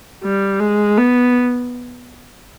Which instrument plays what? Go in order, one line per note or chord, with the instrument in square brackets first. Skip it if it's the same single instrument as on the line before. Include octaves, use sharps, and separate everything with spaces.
[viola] G3
G#3
B3